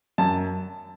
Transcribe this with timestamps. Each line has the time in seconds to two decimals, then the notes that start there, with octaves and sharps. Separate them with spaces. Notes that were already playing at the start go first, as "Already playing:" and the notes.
0.18 F#2 A5